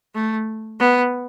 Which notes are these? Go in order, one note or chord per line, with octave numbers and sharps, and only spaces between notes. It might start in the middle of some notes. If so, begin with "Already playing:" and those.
A3
B3